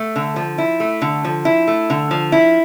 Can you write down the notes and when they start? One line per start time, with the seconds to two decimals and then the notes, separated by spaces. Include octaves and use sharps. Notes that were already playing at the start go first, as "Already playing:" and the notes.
Already playing: A3
0.16 D3
0.36 F3
0.58 E4
0.80 A3
1.02 D3
1.25 F3
1.45 E4
1.67 A3
1.90 D3
2.11 F3
2.32 E4